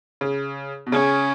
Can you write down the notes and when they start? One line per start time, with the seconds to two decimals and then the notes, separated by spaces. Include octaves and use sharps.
0.21 C#3
0.87 B2
0.92 C#3 C#4